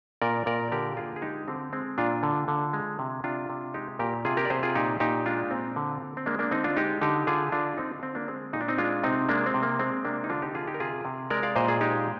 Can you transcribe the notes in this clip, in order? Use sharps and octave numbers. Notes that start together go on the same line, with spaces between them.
A#2 A#4 D5
A#2 A#4 D5
D3 G4 A#4
D3 F4 G#4
G#4
G#3 D#4 G4
D3 C4
G#3 C4
A#2 D4 F4
D3
D3
G#3
C3
C3 D4 F4
C3
G#3 D#4 G4
A#2 G4 A#4
C3 F4 G#4
G4 A#4
D5
C3 G#4 C5
F4 G#4
A#2 D#4 G4
A#2 D#4 G4
G#3 D4 F4
A#2 C4
D3
D3
C4
G#3 A#3 D4
A#3 D4
D3 C4 D#4
D4 F4
G#3 D#4 G4
D3 D#4 G4
D3 F4 G#4
D3 D4 F4
D3 C4 D#4
D3 C4
A#3 D4
G#3 C4
A#2 D#4
D4
C4 D#4
G#3 D4 F4
C3 C4 D#4
G#3 A#3 D4
C4
C3
A#3
G#3 C4
C3 A#3 D4
D#4
D3 D4 F4
D#4 G4
D3 F4 G#4
D#4 G4
A#4
C3 F4 G#4
C3
G#3 A#4 D5
D5 F5
A#2 C5 D#5
F4 G#4
G#3 D#4 G4